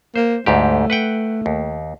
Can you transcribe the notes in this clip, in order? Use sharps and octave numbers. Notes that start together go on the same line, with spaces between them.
A#3 C5
D2 G#2 A3 G4
B4 F#5 G5
D#2